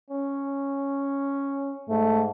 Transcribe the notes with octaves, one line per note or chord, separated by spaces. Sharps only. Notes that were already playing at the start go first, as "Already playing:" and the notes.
C#4
G#2 A3